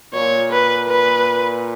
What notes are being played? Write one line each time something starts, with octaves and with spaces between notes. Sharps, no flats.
A#2 C#5
B4
B4